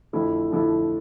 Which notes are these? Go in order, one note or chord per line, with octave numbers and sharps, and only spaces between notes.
F2 D3 F3 A3 E4
F2 D3 F3 A3 E4